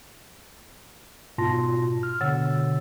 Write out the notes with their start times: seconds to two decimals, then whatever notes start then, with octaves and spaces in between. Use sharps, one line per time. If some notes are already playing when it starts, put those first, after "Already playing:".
1.38 G#2 B2 F4 A5 C6 A#6
2.03 F6
2.21 B2 D3 C#5 F#5 E6 A6